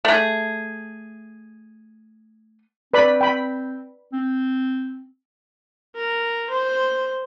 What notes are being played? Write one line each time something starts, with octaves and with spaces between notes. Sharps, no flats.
A3 G#4
C4 B4 D5 B5
G5 B5
C4
A#4
C5